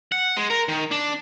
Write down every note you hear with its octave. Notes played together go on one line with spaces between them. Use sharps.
F#5
G#3
A#4
D#3
D4